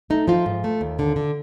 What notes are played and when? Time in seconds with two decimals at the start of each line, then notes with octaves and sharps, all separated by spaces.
0.10 A3 D#4
0.28 F3 F4
0.46 G#2
0.64 A3
0.81 D#2
0.99 D3
1.16 D3